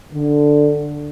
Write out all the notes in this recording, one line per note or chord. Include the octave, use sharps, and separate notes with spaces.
D3